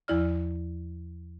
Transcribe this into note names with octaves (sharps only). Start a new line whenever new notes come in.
E2 F3 E4 D5 F6